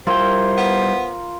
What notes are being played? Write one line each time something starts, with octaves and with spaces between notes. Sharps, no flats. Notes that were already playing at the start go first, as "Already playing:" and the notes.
G3 E4 F4 A#4 C5 G5
B3